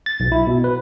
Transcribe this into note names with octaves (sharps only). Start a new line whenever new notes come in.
A6
B1
E4
B2
B4